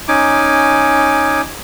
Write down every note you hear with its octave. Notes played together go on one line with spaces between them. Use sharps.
C#4 D#4 G#5 D6